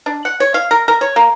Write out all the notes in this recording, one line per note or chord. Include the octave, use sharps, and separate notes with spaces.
D4
F#5
C#5
F5
A#4
A#4
C#5
A#3